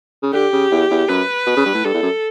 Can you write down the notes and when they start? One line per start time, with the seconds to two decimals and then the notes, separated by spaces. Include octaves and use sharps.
0.22 C#3
0.33 D3 G4
0.53 C#3
0.71 E2
0.91 E2
1.09 F#2 B4
1.46 B2
1.57 C#3
1.65 G2
1.74 A2
1.84 G2 A4
1.94 E2
2.03 F#2